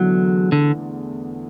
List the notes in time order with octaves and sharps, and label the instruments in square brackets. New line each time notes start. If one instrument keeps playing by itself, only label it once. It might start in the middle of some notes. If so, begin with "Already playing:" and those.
Already playing: [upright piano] E2 D3 A3 [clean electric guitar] F#3
[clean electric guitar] D3